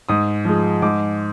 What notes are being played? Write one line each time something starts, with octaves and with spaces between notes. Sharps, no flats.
G#2 D#6
F3 G#3
G#2 D6